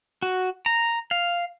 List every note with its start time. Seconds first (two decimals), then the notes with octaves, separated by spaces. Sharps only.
0.22 F#4
0.66 A#5
1.11 F5